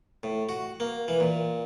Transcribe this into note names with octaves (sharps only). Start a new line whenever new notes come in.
A2
F#4
A#3
E3
A#2